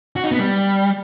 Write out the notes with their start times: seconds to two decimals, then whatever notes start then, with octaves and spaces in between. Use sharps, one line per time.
0.16 F#4
0.24 D#4
0.32 B3
0.39 G3